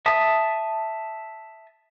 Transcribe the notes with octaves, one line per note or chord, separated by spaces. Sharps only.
E5 A5 D#6